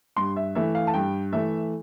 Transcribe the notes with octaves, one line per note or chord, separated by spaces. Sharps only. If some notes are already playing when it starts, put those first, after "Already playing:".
G2 C6
E5
E3 A3 E5
F5
A5
G2 G5
E3 A3 E5